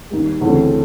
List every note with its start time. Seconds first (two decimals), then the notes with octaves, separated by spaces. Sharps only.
0.10 D#2 D#3 G3
0.41 D2 C#3 E3 A3 C4